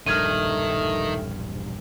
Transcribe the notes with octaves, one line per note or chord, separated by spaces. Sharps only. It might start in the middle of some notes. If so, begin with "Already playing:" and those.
E1 A#1 G2 D#3 A3 F6 G#6 D#7